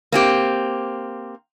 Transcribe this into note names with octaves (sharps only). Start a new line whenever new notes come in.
A#3 C4 G4